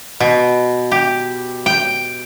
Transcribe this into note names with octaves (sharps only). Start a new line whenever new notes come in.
B2
G4
G5